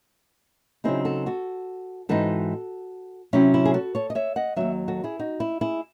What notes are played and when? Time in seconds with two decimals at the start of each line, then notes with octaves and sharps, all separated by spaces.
0.84 C#3 F#3 C4 D#4 E4 G#4
1.05 F#4 A4
1.26 F#4 A4
2.09 G#2 E3 C4 D#4 F#4 A4
3.33 C3 F#3 C#4 E4
3.54 E4
3.65 G#4
3.74 F#4 A4
3.95 A4 C#5
4.10 D#5
4.15 C#5 E5
4.36 D#5 F#5
4.56 D#2 D#3 F#3 C#5 E5
4.88 F#4 A4
5.04 E4 G#4
5.19 D#4 F#4
5.40 E4
5.61 E4 G#4